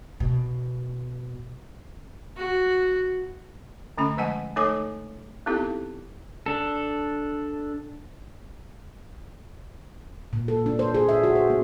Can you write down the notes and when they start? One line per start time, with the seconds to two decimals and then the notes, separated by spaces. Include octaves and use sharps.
0.20 B2
2.37 F#4
3.98 D3 A3 C#4 B5
4.17 F3 G#3 D#5 F#5 G#5 A5
4.56 A3 D#4 A4 C#5 G#5 D6
5.46 B3 C4 D#4 E4 G4 A4
6.46 D4 A4
10.33 A#2
10.48 A4
10.66 D4
10.79 C5
10.94 G#4
11.09 E5
11.24 F#4
11.35 C5
11.50 B3